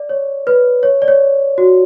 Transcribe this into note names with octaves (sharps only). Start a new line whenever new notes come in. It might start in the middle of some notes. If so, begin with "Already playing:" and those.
Already playing: D5
C#5
B4
C#5
D5
C#5
F#4